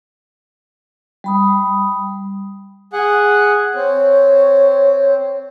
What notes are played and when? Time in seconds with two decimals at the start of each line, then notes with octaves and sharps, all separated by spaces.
1.24 G3 B5 D#6
2.93 G#4 F#5
3.75 C4 C#5